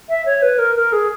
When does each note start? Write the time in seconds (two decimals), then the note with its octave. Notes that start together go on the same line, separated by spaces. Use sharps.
0.09 E5
0.26 C#5
0.42 B4
0.59 A#4
0.76 A#4
0.92 G#4